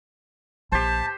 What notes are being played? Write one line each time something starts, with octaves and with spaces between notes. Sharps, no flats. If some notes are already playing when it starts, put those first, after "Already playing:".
A#1 G4 C5 A5